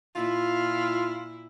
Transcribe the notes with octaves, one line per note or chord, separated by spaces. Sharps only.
A#2 E4 F4